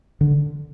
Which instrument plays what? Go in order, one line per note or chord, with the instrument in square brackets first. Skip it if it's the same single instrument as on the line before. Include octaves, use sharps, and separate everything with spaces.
[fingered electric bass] D3